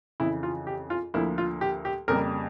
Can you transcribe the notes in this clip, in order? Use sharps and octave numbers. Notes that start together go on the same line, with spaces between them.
F2 C#3 E3 E4
F4
G4
F4
D2 D3 F3 A#3 E4
F4
G4
G4
F2 C#3 G3 A#3 A#4